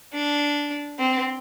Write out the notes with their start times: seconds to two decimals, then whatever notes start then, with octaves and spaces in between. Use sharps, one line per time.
0.13 D4
0.99 C4